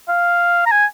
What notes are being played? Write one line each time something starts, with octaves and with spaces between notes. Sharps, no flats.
F5
A#5
G#5